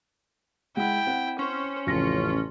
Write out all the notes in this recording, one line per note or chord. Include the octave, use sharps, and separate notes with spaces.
G#3 E4 F#5 G5
C4 F#5
C#4 C5
A1 F2 C#3 F4 A#6